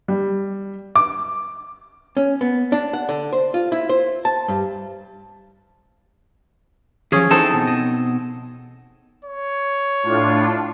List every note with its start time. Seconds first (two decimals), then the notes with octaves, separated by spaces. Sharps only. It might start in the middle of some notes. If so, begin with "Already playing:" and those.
0.08 G3
0.96 D6
2.17 C#4
2.41 B3
2.72 D4
2.93 F#5
3.09 D3
3.32 C5
3.54 F4
3.72 E4
3.89 C5
4.25 A5
4.48 G2
7.12 E3 F3 C#4 G#4
7.30 E3 C4 D#4 E4 A4 A5
7.53 B2
7.67 D#5
9.25 C#5
10.03 A2 D4 F4